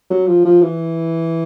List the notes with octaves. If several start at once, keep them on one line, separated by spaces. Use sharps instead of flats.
F#3
F3
F3
E3